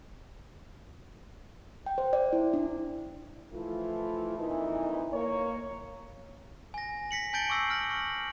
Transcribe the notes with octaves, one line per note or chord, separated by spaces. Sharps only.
G5
C5
D5
E4
D4
E3 F3 A3 E4 F4
F2 A#2 E3 D#4 E4
A#3 C#5
G#5 A#6
A#6 B6 C#7 F#7
G#5 A5 G6 A6 D7 G7
C#6 D6 E6 A#6 C7
F6 A#6 F#7
C#6